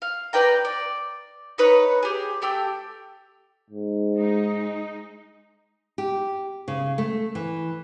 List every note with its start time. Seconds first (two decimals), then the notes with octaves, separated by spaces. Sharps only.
0.02 F5
0.33 B4 D5 G5 A#5
0.65 D5
1.58 D#4 B4 C#5
2.03 G4 G#4
2.42 A3 G4 G5 E6
3.70 G#2
4.15 G#3 D#4
5.98 G4
6.68 C#3
6.98 A3
7.35 E3